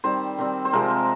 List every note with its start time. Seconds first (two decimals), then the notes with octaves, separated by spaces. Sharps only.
0.04 D#3 G3 C4 C5
0.38 D#3 G3 C4
0.65 C5
0.73 C3 F3 G#3 C4 A#4